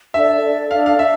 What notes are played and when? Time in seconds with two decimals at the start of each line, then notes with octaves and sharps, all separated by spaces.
0.14 D4 A4 D5 E5
0.43 D4 A4 D5
0.71 D4 A4 D5 F5
0.86 F5
0.99 D4 E5